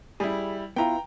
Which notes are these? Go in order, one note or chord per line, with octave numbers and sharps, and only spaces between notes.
G3 E4 G#4
B3 E4 F4 G5 A#5